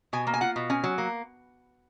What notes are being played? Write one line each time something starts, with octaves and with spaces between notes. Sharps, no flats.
B2 G#5
A#3
G#5
F4 F#5
B2
C#4 G#5
F#3
A#3